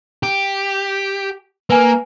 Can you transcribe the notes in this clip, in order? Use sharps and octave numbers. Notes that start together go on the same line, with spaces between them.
G4
A#3 B4 G#5